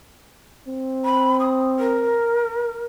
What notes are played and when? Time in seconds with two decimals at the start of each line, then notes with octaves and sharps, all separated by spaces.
0.67 C4
1.04 B5
1.39 D#6
1.79 A#4